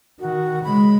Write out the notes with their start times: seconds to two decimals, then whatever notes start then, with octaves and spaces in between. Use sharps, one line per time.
0.20 D#3 F#4
0.64 C#3 G#3 B5